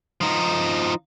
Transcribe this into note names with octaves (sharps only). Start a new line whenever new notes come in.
F3 D#4